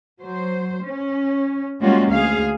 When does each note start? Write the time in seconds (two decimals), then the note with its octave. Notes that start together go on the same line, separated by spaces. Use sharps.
0.22 F#3 C5
0.84 C#4
1.80 G3 G#3 A#3 C#4 F4 F#4
2.10 D2 G#4 F5